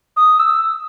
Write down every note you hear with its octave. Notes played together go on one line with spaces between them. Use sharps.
D#6
E6